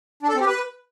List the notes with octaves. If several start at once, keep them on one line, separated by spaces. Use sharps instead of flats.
D4
A4
C4
G4
B4